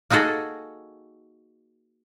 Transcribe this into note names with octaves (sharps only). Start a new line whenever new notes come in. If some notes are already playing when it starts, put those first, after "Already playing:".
A#3 D#4 F#4 G#4 A4